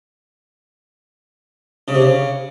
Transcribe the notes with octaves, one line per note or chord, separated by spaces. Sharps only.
C#3
C3
C#3